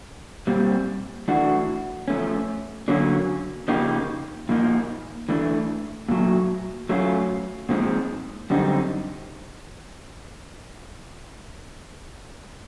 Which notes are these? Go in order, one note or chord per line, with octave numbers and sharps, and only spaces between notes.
A#2 G3 C4
E3 A3 D4 F#4
F3 A3 C#4
D3 F#3 A#3 C#4
C#3 F3 A#3 D#4 G4
A#2 F3 A#3 D#4
E3 A3 D4
A#2 F#3 A3
F#3 A3 C#4 F4
A#2 F3 G#3 C4 D#4
F#2 D3 G3 C4 D#4